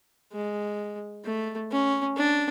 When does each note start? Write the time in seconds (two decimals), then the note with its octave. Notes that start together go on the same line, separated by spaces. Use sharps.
0.32 G#3
1.24 A3
1.71 C#4
2.17 D4